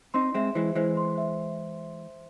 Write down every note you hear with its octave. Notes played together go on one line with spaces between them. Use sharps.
C4 D#4 C6
G#3 C4 E5
E3 G#3 C5
E3 G#3 C5
C6
E5